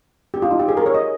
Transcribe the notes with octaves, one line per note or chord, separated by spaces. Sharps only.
G4
F4
D#4
G4
G#4
A#4
C#5
D#5